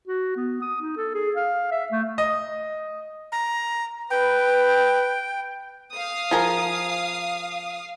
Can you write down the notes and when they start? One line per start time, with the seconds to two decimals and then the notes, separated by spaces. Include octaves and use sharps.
0.08 F#4
0.37 B3
0.62 D#6
0.81 D#4
0.97 A4
1.14 G#4
1.36 F5
1.72 E5
1.92 A3
2.18 D#5
3.32 A#5
4.10 B4 G5
5.93 F5 D#6
6.31 F3 G#4 A#4